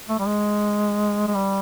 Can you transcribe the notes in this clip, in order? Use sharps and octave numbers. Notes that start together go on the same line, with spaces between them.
A3
G3
G#3
G#3
G3